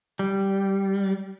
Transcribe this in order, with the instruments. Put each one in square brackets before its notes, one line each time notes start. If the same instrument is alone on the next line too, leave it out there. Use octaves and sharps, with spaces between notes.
[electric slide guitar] G3